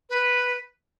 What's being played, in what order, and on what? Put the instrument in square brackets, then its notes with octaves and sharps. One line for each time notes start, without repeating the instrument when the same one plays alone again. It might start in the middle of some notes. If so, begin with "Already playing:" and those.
[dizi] B4